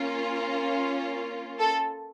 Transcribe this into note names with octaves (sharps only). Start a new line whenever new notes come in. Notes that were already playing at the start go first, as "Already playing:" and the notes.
Already playing: A#3 C#4 F4
A4